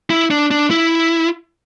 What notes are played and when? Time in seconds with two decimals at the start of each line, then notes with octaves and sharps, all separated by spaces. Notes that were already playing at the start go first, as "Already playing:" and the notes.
0.10 E4
0.31 D4
0.51 D4
0.71 E4